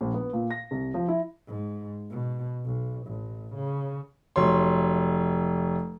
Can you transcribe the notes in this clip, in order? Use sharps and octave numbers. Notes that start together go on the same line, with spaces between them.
A#1
B3
A#2
A#6
C2
F3
E4
G#2
B2
B1
A1
C#3
F1 F#3 C#5 C6